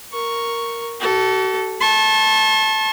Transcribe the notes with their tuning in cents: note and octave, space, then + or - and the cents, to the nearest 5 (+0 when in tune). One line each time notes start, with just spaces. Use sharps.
A#4 +0 C#6 +0
F#4 +40 A4 +0
A5 -10 C#6 -45